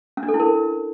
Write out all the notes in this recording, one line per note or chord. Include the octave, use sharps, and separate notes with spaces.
C#4
D4
A4
E4
A#4